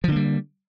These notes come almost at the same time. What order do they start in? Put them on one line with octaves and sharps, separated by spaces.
F3 D3 A#3 G3